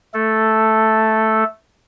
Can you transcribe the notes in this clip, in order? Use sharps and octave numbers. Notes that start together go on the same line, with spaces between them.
A3 A4